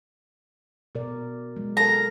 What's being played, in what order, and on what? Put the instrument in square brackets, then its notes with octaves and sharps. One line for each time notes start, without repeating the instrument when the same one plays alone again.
[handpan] B2 A#4 D5
F#3 G#3
[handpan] A4 A#4 [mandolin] A#5